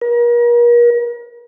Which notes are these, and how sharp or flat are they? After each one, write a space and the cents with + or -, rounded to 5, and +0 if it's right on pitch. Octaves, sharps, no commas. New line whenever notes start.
A#4 +40